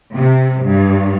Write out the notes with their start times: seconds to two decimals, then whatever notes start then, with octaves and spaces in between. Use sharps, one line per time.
0.14 C3
0.65 G2